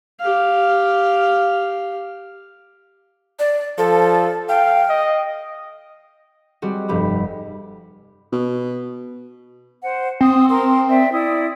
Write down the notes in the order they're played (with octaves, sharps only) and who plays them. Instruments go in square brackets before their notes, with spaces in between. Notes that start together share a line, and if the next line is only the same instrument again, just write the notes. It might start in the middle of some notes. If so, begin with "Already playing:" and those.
[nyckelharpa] G4 F5
[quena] D5
[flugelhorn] F3 [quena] A4
[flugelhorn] F5 [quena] G5
[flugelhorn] D#5
[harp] G3 G#3 C4 F#4
F1 G2 G4 B5
[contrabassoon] B2
[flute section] C5 F#5
[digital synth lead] C4 [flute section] D#6
[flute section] A#4 C6
D5 E5 G5
E4 D5 D#6